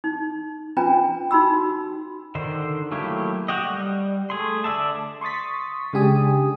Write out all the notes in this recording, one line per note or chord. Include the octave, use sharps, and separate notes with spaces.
D#4
C#4 D4 F4 B4 G5 A#5
D#4 F#4 B5 E6
F#4
D3 D#3 C5
F#3 A3 A#3 E4 G4
F#4 G4 D#5
G3
A3 G#4 C6
D3 D5 E5 A5
C6 C#6 D#6 A6 B6
C#3 G#3 D4 G4 G#5 D#6